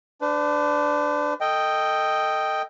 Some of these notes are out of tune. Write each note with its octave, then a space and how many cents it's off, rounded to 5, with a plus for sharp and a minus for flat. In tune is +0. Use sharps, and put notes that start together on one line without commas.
D4 +0 B4 +45
A4 +15 D#5 +0 G5 +0